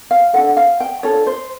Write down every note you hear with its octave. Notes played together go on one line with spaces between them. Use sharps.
F5
D4 F4 A4 F#5
F5
G5
D4 F4 A4 C#5
C5